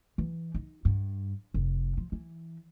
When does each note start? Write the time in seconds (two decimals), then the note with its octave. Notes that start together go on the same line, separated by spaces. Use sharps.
0.18 E3
0.54 D#4
0.85 G2
1.54 F1
1.97 F3
2.12 E3